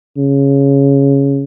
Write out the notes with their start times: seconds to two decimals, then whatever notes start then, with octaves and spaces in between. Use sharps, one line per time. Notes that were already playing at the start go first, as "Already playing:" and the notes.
0.17 C#3